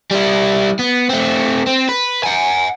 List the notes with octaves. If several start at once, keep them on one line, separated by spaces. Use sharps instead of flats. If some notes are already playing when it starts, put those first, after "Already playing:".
G3 E4
B3
A3 C4
C4
B4
F#5 G#5